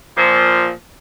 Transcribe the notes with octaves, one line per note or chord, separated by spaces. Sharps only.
A#2 F3